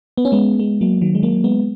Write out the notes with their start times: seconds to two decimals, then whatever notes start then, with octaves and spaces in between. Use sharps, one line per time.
0.17 B3
0.25 C#4
0.32 G#3 B3
0.59 G#3 B3
0.81 F#3 A#3
1.01 D#3 F#3
1.15 G#3
1.23 F#3 A#3
1.44 G#3 B3